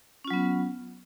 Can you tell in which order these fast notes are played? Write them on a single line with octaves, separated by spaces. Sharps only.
C#4 F4 F#3 B3